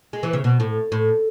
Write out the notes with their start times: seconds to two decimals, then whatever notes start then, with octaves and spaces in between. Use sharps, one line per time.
0.13 G#3
0.23 E3
0.33 C#3
0.44 B2
0.60 A2
0.92 A2